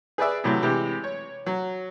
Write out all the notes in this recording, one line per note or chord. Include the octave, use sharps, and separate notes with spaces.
G#4 B4 D5 E5
A2 C3 E3 F#3
C3 E3 G#3 G4
C#5
F#3